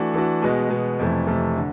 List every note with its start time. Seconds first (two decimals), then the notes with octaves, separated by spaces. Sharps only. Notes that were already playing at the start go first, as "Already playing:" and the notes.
Already playing: E3 A3 D4 F#4
0.13 E3 A3 D4 F#4
0.42 B2 G#3 B3
0.70 B2 G#3 B3
0.99 F2 C3 E3 A3
1.27 F2 C3 E3 A3
1.57 D3